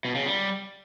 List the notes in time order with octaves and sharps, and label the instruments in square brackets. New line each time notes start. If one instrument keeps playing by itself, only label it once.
[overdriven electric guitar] B2
C#3
G3